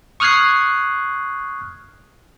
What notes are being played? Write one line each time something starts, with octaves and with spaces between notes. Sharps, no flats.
C#6 D#6 F6 F#6 G#6 C7